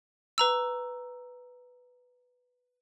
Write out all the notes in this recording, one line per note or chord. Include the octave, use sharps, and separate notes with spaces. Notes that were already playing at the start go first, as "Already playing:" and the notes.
B4 A#5 E6